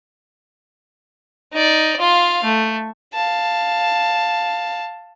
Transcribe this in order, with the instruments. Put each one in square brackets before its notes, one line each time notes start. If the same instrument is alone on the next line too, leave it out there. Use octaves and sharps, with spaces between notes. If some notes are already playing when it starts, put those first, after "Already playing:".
[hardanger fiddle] D#4 D5
F4 F5
A3
[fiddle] F5 A5